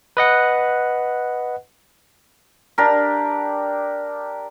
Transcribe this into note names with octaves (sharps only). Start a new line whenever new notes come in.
B4 D#5 F#5
D4 G4 A#4